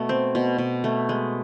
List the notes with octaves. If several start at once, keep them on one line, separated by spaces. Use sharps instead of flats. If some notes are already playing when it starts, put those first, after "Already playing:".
Already playing: B2 A3
C4
B2
B2
A3
G#3